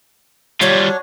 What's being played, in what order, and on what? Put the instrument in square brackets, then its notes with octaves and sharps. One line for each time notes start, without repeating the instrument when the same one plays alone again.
[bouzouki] F#3 C#4 D4 [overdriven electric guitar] G3 F4